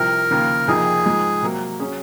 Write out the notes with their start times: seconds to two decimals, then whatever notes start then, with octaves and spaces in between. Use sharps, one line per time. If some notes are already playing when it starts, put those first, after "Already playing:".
Already playing: C2 C3 F3 A#4
0.31 D#2 C#3 F3 A#3 F4
0.67 F2 C3 F3 A#3 D#4 G#4
1.05 G#2 F3 G#3
1.43 C3 F#3 A#3
1.80 F#3 C#4 G#4